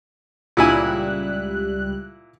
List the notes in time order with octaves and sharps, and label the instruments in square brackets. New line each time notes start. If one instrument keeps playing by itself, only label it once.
[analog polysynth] C#2 G3 F#6 [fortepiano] A#2 E4 G#5